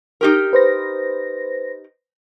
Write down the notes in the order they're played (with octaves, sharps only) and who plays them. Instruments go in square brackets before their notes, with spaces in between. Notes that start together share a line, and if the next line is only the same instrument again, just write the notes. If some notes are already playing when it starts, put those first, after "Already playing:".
[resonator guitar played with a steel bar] D#4 G4 A#4
[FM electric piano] B4 C5 A#6